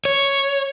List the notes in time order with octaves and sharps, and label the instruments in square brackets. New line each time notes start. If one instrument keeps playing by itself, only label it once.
[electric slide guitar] C#5